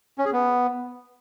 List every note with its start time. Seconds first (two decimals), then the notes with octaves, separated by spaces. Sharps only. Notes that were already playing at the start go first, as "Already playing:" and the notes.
0.18 C#4
0.25 G#4
0.33 B3